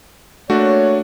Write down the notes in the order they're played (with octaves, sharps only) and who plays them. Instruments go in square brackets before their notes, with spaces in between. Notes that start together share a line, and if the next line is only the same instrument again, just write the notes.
[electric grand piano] A3 D4 F#4 [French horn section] A#3 C#5